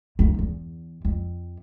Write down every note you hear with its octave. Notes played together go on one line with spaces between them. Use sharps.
F2 D#3
E2
F2